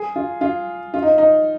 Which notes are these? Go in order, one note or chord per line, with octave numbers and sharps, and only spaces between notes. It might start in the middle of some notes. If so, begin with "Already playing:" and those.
Already playing: G#4
F4
F4
F4
D#4
D#4